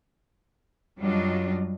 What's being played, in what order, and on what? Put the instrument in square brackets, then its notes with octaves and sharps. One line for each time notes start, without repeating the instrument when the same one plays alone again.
[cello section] F#2 F#3 G3 D4 F4 D#5